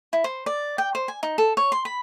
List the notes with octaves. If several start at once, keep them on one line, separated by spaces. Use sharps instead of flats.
E4
C5
D5
G5
C5
G#5
D#4
A4
C#5
C6
B5